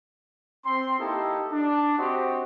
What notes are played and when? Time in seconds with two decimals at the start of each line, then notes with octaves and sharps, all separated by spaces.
0.65 C4 C6
0.99 A#3 D#4 E4 G4 A4 D#5
1.51 D4
1.99 C4 F#4 G4 C5 D#5